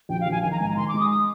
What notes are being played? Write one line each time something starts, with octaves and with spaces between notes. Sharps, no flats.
A#1 G5
F5
A#1
G#5
D#3 G#5
A#5
G#2 G#5
A#5
D#3 C6
D6
G#3
D#6
D#6